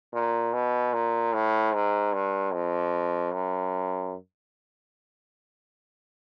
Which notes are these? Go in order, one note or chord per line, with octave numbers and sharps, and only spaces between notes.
A#2
B2
A#2
A2
G#2
G2
F2
F#2